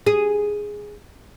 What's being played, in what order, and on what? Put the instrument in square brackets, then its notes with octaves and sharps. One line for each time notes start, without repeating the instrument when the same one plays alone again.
[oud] G#4